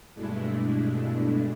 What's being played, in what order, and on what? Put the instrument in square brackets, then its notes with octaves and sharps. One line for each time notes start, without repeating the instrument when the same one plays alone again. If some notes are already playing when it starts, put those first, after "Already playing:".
[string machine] G2 B2 G#3 A3 D4 E4